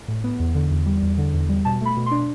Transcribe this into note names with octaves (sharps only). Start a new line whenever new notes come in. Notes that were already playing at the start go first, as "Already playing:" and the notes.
A2
B3
E2
D3
E2
G3
E2
D3
E2
G3
B2 A5
A3 B5
B2
C6
D4